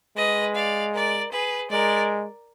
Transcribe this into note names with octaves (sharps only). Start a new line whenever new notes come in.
G#3 B4 D#5
D5 F5
A#4 D5
G#4 B4
G#3 A#4 D5